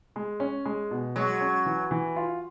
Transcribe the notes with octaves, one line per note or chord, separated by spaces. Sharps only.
G#3
C#4
G#3
B2
F#3 G#3
C#4
E3
E3
F4